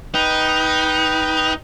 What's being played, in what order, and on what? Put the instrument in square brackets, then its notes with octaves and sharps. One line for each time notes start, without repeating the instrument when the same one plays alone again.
[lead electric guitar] D#4 [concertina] B4 G5 D#6